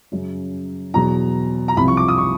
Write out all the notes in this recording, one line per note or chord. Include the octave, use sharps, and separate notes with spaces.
F#2 C#3 F#3
E2 B2 F#3 A#5
A#5
C2 C3 F3 B5
C#6
D6
D#6
C#6